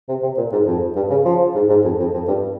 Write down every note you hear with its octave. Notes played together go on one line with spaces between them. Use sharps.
C3
C3
A#2
G#2
F2
G2
C#3
F3
G#2
G#2
F2
F2
F2
G2